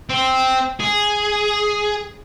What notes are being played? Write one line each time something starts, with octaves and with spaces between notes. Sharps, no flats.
C4
G#4